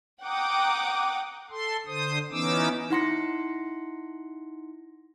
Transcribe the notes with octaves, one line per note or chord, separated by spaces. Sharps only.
F#5 G5 A#5 D6 D#6
A4 C6
D3 C5 D#6
E3 B3 C#4 D#4 D6 E6
D#4 E4 F#5 C6 A#6 C#7